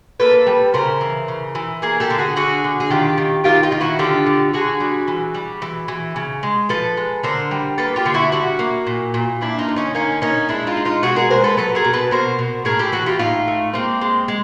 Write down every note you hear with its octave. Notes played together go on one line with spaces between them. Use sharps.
A#3 A4 B4
G3
C#3 A#4 C5
E3
C#3
E3
A#3 G#4 A#4
G4 A4
D3
F#4 G#4
D3 F#4 G#4
D3
G#4
D#3 F4 G4
D#3
D#3 F4 G4
D#4 F4
D#3
E4 F#4
D3 F4 G4
D3
D3 F#4 G#4
G3
E3
G3
E3
E3
C#3
G#3
F3 A4 B4
G#3
D3 A#4 C5
G3
A#3 A4 B4
F4 G4
D3
E4 F#4
G3 E4 F#4
A#3
A#2
A#2
A#3 D4 E4
D#4 F4
D3
C#4 D#4
A#3 C#4 D#4
A#3 C#4 D#4
G#3 D4 E4
D#4 F4
G#3
D#4 F4
B2 F#4 G#4
G#4 A#4
G#3 A#4 C5
A4 B4
F#3 A4 B4
G#4 A#4
B2
A4 B4
B2 A#4 C5
B2
A2 G#4 A#4
G4 A4
E3 F#4 G#4
F4 G4
A2 D#4 F4
A3
G#3 A#3 C4
G#3
G#3